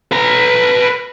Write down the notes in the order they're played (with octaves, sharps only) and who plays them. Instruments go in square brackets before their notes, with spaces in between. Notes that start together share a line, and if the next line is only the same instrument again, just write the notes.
[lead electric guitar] B4 A#5